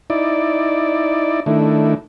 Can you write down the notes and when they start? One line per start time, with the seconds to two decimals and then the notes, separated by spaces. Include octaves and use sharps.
0.10 D#4 E4 D5
1.46 D#3 A3 D4 E4